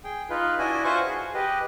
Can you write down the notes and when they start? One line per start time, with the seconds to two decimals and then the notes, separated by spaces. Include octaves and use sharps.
0.04 G#4 G5
0.30 D#4 F4 B4
0.59 D4 E4 F#4 D#5 G#5
0.84 F4 F#4 B4 C5 G#5 C#6
1.06 G#4
1.34 G4 B4 D#5